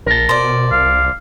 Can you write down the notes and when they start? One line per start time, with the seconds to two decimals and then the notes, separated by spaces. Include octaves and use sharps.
0.06 A#1 A#4 A5
0.29 B2 C5 D5
0.72 C2 F5